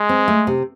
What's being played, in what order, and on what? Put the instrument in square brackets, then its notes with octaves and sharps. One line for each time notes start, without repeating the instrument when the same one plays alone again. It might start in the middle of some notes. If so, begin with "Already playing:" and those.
Already playing: [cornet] G#3
[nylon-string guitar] C4
A3
C3